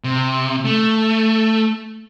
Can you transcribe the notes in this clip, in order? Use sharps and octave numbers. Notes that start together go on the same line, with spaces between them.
C3
A3